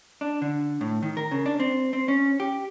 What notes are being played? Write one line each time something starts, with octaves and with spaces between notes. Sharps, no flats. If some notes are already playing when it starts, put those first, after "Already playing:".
D4
D3
A2
D#3
A#4
C#3
D4
C4
C4
C#4
G4